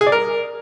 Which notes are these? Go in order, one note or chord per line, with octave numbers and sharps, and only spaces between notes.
G#4
D5
A#4